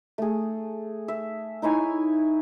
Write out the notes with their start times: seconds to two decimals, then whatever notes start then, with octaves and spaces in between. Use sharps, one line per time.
0.18 A3 G#4
1.08 E5
1.62 D#4 E4 C#5 G#5